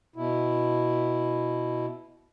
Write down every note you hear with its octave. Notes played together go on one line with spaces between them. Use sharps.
B2 E4